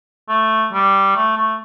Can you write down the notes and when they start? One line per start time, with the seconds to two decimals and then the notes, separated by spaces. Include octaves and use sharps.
0.29 A3
0.73 G3
1.16 A3
1.37 A3